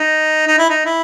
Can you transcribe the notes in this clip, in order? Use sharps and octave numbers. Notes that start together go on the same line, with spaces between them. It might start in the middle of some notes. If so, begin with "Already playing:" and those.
Already playing: D#4
D#4
E4
D#4
E4